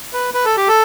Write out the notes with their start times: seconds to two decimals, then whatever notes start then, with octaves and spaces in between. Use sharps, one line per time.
0.13 B4
0.34 B4
0.45 A4
0.57 G4
0.68 A4